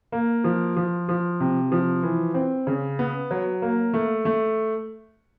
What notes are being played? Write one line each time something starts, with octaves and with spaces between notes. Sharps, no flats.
A#3
F3
F3
F3
C3
F3
E3
C4
C#3
B3
F#3
A#3
A3
A3